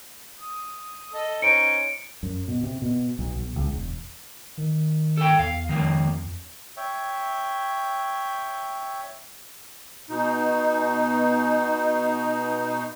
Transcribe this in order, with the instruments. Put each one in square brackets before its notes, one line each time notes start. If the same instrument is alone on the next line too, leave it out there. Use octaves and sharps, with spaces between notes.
[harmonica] D#6
A4 D#5
[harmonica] C#4 D#4 C5 [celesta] C#7 D7
[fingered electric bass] F#2
B2
C3
B2
B1
B1
C#2
E1
[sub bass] D#3
[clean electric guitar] A4 G5
[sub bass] E2 [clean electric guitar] F5
[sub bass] F2 [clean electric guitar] D#3 F3 A#3
[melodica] C#5 E5 G5
[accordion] B2 D#4